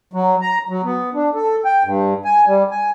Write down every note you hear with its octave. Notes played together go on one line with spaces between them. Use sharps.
F#3
A#5
F#3
B3
D4
A4
G5
G2
G#5
G3
G#5